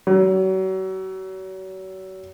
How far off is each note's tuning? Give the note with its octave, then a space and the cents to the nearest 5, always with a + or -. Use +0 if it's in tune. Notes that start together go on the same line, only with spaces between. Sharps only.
F#3 +35